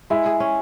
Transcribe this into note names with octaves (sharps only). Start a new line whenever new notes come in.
G#3 E4
G#4
C#4